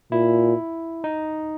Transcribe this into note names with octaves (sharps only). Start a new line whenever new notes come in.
A#2 E4
D#4